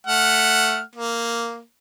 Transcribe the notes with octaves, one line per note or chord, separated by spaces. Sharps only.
A3 F#5 F6
A#3